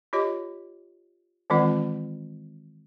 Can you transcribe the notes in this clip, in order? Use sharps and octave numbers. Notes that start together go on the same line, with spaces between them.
F4 G4 C#5 D#5
D#3 E3 G#3 C4 F4 F#5